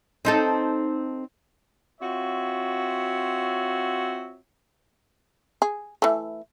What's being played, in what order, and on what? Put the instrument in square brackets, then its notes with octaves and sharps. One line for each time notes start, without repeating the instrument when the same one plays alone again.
[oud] C4 D#4 A4
[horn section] C4 F4 F#4 C#5 E5
[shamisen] G#4
E3 A3